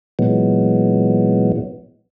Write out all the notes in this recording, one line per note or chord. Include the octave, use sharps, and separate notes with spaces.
A#2 E3 F#3 G#3 B3